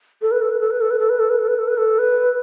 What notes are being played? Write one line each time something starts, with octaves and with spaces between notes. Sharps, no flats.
A4
B4
A4
B4
A4
B4
A4
B4
A4
B4
A4
B4
A4
B4
A4
B4
A4
B4